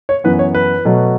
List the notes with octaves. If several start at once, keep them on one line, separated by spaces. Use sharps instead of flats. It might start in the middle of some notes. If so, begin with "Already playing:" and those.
C#5
F#2 E3 B3 B4
C#5
B4
B2 F#3 A3